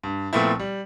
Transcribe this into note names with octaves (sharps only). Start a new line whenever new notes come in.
G2
A#2 F3 A3 B3 C4 E4
G3